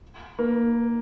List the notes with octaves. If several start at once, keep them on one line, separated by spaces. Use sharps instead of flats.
A#3